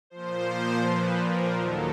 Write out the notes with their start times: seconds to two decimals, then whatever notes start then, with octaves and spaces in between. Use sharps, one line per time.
0.10 A#2 F3 C5
0.83 B4
1.19 A#4
1.55 D#2 D#3 F#3 A4